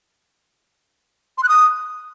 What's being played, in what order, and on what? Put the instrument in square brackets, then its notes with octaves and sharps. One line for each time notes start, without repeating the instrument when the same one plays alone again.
[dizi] C6
F#6
D#6